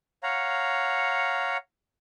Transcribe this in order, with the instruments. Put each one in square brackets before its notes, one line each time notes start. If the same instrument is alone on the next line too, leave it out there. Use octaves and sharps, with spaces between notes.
[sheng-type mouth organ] C#5 F5 F#5 A#5